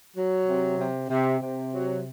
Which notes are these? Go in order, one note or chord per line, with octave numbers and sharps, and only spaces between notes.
F#3
C3
C3
C3
C3
F#3